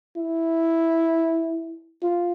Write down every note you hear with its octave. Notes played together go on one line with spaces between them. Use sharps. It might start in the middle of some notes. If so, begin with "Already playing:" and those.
E4
F4